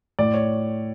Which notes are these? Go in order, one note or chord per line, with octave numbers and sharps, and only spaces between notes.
A2 D5
C#5